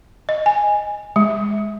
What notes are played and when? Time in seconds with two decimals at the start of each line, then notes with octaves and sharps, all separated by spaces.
0.29 D#5
0.46 G#5
1.16 G#3